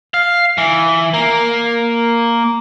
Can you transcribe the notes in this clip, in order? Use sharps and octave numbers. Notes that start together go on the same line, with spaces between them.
F5
E3
A#3